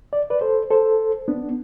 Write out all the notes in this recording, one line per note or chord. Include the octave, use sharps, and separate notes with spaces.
D5
B4 D5
A4 C5
A4 C5
B3 D4